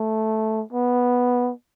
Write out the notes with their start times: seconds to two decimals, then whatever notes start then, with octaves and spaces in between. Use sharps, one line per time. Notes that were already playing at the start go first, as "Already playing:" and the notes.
Already playing: A3
0.73 B3